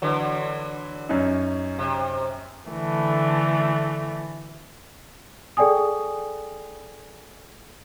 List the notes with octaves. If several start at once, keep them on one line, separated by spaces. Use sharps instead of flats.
D3 E3 F#3
F#2 C#4 D#4
C3
D3 E3 A3
G#4 A4 D5 G5 G#5 D#6